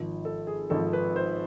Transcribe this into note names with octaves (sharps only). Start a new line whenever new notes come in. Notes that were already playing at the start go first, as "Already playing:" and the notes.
Already playing: G#1 G#2 F3
A4
G#4
G#1 G#2 F3 A4
B4
C5